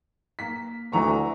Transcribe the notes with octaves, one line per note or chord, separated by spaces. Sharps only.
A#3 B6
D2 E3 A#5 C#6